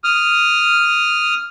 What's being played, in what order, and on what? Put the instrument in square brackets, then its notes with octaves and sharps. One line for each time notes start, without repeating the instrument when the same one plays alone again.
[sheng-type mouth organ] D#6 F6